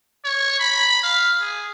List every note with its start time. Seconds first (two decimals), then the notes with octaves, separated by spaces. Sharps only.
0.25 C#5
0.60 B5
1.03 F5
1.41 G#4